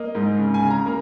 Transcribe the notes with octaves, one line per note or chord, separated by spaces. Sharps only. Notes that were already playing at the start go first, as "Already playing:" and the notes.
Already playing: A#3 D#5
G#2
C#3
G#5
C#3
A#5
A#3